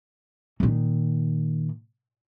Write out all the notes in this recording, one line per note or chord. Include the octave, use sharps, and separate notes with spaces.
A#2 D#3